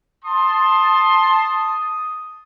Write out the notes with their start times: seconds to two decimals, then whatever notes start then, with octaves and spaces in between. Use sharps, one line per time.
0.25 A5 C6 D#6